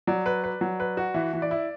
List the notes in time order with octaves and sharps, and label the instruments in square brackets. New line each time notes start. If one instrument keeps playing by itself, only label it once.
[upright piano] F#3 [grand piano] D5
[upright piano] B4
B4
F#3
B4
F#4
[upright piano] E3 [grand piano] E5
[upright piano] E3
[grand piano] D5
[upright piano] E4